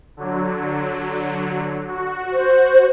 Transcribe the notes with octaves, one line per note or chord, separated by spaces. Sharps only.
D3 F#3
F#4
C5